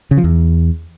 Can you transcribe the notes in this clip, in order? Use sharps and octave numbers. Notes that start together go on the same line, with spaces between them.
C#3
F3
E2